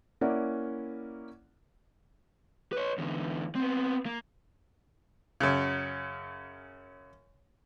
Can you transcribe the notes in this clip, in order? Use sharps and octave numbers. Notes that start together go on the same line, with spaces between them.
A#3 C#4 E4 A#4 D5 F#5
B4 C#5
E2 D3
B3 C4
A#3
F#2 C#3